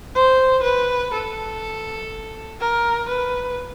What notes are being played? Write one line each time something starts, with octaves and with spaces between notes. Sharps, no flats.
C5
B4
A4
A#4
B4